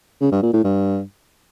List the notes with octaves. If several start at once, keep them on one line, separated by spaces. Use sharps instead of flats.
C#3
G2
A#2
A2
G2